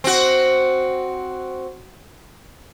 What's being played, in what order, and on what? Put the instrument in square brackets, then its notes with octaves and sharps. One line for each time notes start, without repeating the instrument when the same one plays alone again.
[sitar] C4 F#4